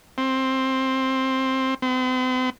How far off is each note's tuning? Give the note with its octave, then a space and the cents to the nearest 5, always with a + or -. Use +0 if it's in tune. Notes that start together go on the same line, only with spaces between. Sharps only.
C4 +10
C4 -45